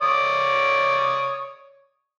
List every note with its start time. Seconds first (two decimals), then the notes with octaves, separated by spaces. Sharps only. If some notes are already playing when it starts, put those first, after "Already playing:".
0.02 C#5 D5 D#6